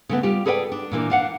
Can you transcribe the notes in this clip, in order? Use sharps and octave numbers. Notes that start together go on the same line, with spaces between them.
C#3 A3 B3
G3 F4 G4
G#4 A4 B4 D5 E5 G5
D4
A#2 E3 A#3 D4
D4 F5 F#5